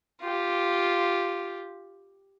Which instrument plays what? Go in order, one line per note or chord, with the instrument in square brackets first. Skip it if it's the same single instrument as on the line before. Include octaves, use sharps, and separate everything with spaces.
[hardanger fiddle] F4 G4